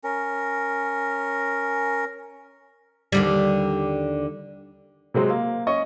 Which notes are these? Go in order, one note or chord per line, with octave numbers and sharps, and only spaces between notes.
C#4 A#4
D#2 D3 G3
C3 F#3 G#3 C4
A#3
C#4 D#5 C#6